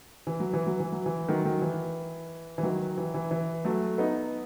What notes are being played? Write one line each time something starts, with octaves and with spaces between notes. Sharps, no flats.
E3
F#3
E3
F#3
E3
F#3
E3
D#3 F#3
D#3 F#3
E3
E3
D#3 F#3
E3
E3
E3
F#3 A3
B3 D#4